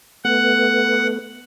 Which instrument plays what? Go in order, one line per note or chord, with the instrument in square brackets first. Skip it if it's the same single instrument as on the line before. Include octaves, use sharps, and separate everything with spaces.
[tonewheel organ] A3 B3 [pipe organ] F#5